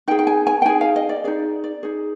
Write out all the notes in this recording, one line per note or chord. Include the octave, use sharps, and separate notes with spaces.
D#4 G#4 G5
G5
G#5
G#5
G5
D#4 G#4 G#5
F5
D#5
D5
D#4 G#4 D5
D5
D#4 G#4